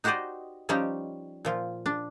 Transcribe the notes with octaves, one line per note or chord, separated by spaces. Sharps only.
D#4 F#4 G4 C5 D5 D#5
F3 G3 C#4 D#4 G4
A#2 F3 F4
D4